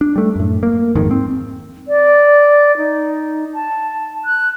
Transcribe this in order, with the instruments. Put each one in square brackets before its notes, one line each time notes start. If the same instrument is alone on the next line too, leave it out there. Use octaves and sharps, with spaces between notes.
[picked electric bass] D4
G3 A3
F#2 A2
A#3
G#1 F2 G#2 D#3
C4
[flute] D5
D#4
A5
F#6